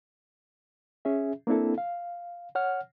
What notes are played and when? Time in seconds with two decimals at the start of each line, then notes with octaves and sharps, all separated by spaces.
1.05 C#4 G#4 E5
1.47 A#3 C4 D4 E4 A4
1.78 F5
2.55 C#5 F#5 F6